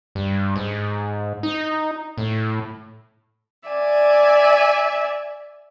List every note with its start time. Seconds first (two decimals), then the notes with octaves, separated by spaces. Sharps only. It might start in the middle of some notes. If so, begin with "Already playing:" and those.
0.15 G2
0.56 G#2
1.43 D#4
2.18 A2
3.68 D5 E5 G#5